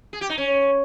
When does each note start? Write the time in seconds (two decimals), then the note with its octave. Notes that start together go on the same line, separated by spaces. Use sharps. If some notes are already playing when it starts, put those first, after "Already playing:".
0.13 G#4
0.21 G4
0.29 D#4
0.38 C#4